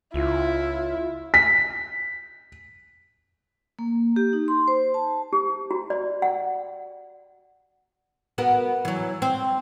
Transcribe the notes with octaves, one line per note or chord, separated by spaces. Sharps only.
C#2 E4 F4
B6
A#3
G4
D#4
C6
C5
A5
G4
F#4
D5
F#5
B3 F#4 A#4
E3 F#3
C4